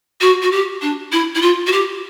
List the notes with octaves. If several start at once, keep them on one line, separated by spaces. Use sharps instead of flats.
F#4
F#4
G4
D4
E4
E4
F4
F#4
G4